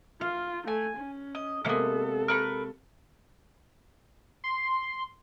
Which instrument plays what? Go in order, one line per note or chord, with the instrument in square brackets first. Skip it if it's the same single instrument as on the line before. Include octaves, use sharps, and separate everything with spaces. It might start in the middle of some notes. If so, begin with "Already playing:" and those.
[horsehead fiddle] F4 [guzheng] F5
[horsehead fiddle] A3 [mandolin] G#5
[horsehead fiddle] C#4
[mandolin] D#5
[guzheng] C3 G#3 A#3 [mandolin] B3 C#4 [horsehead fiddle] A4
[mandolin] A#4 B4 C#6
[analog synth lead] C6